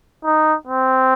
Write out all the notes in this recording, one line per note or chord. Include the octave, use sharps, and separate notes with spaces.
D#4
C4